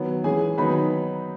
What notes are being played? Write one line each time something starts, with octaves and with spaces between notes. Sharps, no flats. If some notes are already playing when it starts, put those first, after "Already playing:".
Already playing: D#3 F#3 B3
E3 G#3 C#4 G#4 G#5
D#3 F#3 B3 D#4 B4 B5